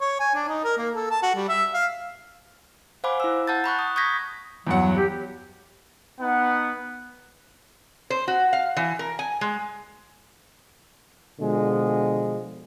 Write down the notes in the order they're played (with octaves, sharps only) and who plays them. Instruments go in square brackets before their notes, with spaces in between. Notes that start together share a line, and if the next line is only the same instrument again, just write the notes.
[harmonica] C#5
G#5
D4
D#4
A#4
A#3
A4
A5
F#4
G3
E5
F5
[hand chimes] C5 F5 F#5 G#5 B5 D6
E4 E6
F#5 A5 G6 A6
A#5 B5 C#6 F#6
D#6
C#6 D#6 G6 G#6 A#6 B6
[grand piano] E2 G2 F#5 [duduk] F#3
[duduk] G4
[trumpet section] B3 D#4 F#5
[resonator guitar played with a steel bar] C5
F#4
F5
E3
A#4
G#5
G#3
[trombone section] B2 D3 F3 G#3